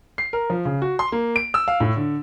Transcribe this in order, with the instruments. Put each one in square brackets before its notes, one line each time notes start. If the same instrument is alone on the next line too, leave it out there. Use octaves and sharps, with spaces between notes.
[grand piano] C7
A#4
F3
C#3
F#4
C6
A#3
D7
E6
F5
A2
D3